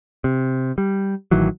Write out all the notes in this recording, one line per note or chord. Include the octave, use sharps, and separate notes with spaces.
C3
G3
A1 D#3 E3 F#3